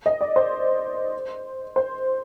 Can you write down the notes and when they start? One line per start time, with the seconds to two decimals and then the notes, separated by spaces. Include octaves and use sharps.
0.06 D#5
0.21 D5
0.36 C5
1.76 C5